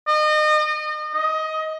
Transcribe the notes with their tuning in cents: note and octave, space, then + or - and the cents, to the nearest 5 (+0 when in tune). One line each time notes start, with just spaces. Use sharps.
D#5 -35
D#5 +20